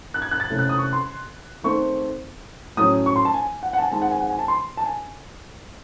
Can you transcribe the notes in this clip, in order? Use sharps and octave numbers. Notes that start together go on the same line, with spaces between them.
F#6
G#6
F#6
A6
C3 E3 A3 C#4
F#6
D#6
C#6
C6
D#3 A3 C4 C#6
A2 F#3 C#4 D#6
C#6
C6
A5
G#5
F#5
F#5
A5
G#5
D#3 G#3 C4 A5
F#5
G#5
F#5
G#5
A5
C6
A5
G#5